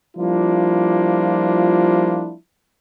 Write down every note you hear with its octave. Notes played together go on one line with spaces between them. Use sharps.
F3 G3 A#3 D4 E4 F4